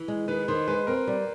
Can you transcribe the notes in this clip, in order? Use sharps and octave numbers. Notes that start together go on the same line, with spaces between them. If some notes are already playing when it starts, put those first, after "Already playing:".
Already playing: E3
G#3
D#3 B4
D#3 C5
G#3 B4
C4 A#4
G3